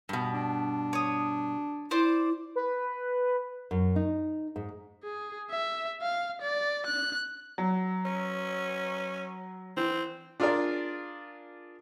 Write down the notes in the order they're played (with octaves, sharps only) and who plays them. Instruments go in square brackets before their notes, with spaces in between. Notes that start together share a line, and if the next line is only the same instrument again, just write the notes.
[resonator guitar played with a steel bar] G2 B2
[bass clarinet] D4
[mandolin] C#5 D#6
[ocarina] E4 [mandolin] C5 D5
[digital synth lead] B4
[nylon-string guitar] F#2
D#4
G#2
[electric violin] G#4
E5
F5
D5
F#6
[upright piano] F#3
[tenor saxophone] C#4
[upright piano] E3 [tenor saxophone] C4
[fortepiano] D4 F4 G#4 A#4 D5